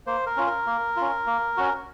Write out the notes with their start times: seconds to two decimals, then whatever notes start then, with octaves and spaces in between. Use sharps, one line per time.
0.06 A#3 C5
0.26 A#4
0.37 C#4 F4
0.47 A#4
0.67 A#3
0.97 C#4 F4
1.27 A#3
1.57 C#4 F#4